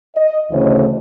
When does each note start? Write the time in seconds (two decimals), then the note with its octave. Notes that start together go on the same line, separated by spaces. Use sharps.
0.16 D#5
0.51 D2 C#3 E3 A3 C5 C#5